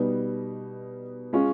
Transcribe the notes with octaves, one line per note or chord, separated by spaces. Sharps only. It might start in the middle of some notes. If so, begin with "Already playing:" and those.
Already playing: B2 G3 B3 D#4
G#3 C#4 F4